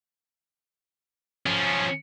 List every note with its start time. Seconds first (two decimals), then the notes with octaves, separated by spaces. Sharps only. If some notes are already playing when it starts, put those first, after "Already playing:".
1.46 F3 C#4